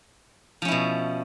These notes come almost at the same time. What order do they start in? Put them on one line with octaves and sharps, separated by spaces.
F3 C#4 E4 B2